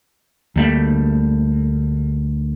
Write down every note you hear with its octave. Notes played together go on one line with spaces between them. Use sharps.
D2 G3 A3 A#3